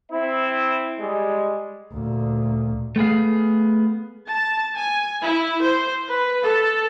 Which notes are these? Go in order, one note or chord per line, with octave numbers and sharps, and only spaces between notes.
C4 E4
G3 G#3
D2 A#2
A3 B3 G#4 F5
A5
G#5
E4
C5
B4
A4